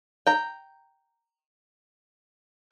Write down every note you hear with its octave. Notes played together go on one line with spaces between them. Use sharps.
G5 A#5